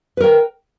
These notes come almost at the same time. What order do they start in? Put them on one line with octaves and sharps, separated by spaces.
B4 A#4 G5